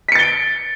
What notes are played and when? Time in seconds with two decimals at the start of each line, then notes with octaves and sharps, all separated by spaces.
0.08 B6
0.12 C#7
0.15 A6
0.19 G7
0.22 D7